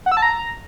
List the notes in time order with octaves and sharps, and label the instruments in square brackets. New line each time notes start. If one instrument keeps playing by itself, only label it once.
[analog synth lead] F#5
E6
A5
A#5